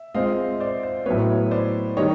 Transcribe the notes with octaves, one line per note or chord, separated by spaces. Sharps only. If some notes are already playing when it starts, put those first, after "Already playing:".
Already playing: E5
G#3 C4 F4 D#5 F5
C5 D5
C5
A2 F#3 B3 B4 C#5
C5 D5
D#3 G3 C#5 D#5